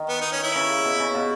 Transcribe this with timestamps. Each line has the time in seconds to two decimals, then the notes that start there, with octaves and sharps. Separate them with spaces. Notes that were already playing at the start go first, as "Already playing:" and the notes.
Already playing: D#3
0.09 B3
0.21 D#4
0.32 C#4
0.44 E4
0.55 C#3
0.85 B2
0.99 C#3
1.15 B2